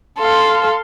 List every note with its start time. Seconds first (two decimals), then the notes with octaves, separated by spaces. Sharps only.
0.19 A4 F5 C6